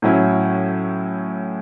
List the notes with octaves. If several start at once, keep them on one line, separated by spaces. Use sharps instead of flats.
A2 F#3 C#4 E4